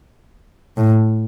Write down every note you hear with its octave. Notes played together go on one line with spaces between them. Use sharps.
A2